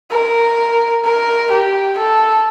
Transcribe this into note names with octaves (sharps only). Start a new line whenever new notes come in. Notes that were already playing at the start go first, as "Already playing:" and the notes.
A#4
A#4
G4
A4